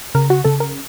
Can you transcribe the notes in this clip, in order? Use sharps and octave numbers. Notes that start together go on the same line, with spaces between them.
C#3 A#4
F#4
C#3 A4
A#4